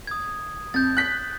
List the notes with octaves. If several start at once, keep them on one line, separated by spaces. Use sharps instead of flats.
D#6 G#6
F2 G6 A6
F#6 B6